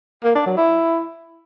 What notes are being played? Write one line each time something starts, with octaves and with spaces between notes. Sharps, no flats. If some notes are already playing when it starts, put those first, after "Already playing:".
A#3
D4
F#3
E4